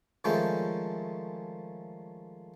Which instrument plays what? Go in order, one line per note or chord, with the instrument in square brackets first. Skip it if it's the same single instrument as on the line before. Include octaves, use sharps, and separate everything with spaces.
[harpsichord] D#3 F3 G#3 A3 C#4 G5